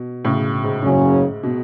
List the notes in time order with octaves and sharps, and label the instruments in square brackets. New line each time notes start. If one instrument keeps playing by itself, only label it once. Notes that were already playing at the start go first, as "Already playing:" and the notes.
Already playing: [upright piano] B2
A2 C#3
G#2
[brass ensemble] F#1 F#2 C#3 F#3 C#4
[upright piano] B2